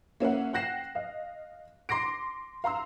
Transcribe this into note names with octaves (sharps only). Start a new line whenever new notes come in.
A#3 C#4 E5 F#5
F#5 G5 F#6 A#6 C7 E7
D#5 F5
C6 D6 A#6 C7 D7
F5 A#5 C6 E6